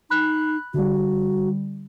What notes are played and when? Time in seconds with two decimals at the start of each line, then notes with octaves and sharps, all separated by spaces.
0.10 D#4 B5 F#6
0.74 D3 G3 F#4